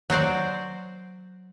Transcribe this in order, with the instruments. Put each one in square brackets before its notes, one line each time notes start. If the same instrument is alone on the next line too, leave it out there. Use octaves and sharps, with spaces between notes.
[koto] F#3 F#4 C5 D5